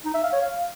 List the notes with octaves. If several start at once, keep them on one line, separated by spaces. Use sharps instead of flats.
D#4
E5
F5
C#5
F5